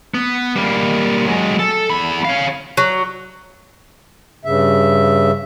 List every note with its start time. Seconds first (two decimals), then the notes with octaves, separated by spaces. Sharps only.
0.14 B3
0.56 G3 A#3
1.27 F#3 G#3
1.59 A4
1.89 E2 B5
2.25 C#5 F5
2.77 F#3
4.45 G2 C#3 E5